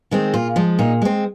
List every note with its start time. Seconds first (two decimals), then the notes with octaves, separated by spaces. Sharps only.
0.11 D#3 G#3 C4
0.34 A#2 F4
0.56 F3 G#3
0.79 A#2 D#4
1.02 G#3 C4